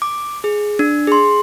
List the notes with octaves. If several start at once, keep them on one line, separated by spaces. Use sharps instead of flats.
D6
G#4
D4
G#4 C6